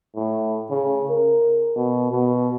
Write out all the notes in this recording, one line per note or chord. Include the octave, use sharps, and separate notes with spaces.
A2
C#3
A#4
B2
B2